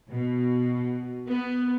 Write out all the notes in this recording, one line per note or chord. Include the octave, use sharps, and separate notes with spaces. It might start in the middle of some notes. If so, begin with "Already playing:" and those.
B2
B3